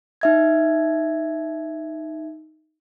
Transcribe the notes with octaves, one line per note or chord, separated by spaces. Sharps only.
D#4 E5 G#6